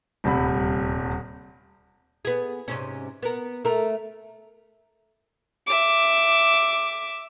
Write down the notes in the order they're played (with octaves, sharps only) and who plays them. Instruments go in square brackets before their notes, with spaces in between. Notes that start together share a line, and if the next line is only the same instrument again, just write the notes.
[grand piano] D#1 D2 C3 G3 B5
[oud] B3 G#4
G#2 C3 C#4
B3 A#4
A3 A#4
[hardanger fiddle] E5 D6